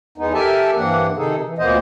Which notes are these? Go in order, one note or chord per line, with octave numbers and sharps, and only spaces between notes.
E2 G#3 B3 D#4
G4 A4 A#4 E5 G#5 A5
G2 E3 A#3 C4 D4 F#5
C3 D#3 D#4 G#4 A4
E3
D2 A#2 A#3 B3 C5 D#5